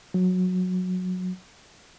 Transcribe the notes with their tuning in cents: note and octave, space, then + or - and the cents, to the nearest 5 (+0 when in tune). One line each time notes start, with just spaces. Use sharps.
F#3 -15